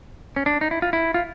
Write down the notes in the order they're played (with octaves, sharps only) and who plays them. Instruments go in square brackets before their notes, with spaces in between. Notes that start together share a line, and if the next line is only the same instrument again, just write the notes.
[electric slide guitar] C#4
D4
D#4
E4
F4
E4
F4